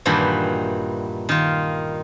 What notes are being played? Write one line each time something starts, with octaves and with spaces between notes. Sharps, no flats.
G2 A#2 D#3 E3 F#4 B5
D#3 F4